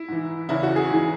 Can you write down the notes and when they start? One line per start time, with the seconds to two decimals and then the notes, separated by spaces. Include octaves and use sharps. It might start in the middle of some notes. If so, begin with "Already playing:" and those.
Already playing: E4
0.08 G#2 E3
0.49 E2 C#3 E3 E4
0.63 F#4
0.76 G#4
0.90 G#2 E3